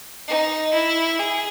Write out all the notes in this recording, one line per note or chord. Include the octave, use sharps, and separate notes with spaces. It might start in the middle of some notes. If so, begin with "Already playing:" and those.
D#4
E4
G#4